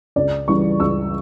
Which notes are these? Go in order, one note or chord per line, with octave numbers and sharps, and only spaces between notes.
C#2 D5
C#3 E3 G3 C#6
C#2 E6